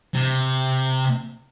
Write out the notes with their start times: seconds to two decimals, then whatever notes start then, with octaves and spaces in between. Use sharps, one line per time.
0.14 C3